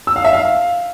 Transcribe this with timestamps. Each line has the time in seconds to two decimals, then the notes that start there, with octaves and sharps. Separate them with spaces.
0.07 E6
0.16 F5
0.25 E5
0.33 F5